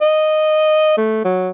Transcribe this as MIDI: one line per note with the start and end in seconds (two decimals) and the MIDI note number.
0.01 0.96 75
0.97 1.23 57
1.25 1.50 54